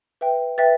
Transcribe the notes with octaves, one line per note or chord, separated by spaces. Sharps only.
B4 E5 G5
B4 E5 G5 A6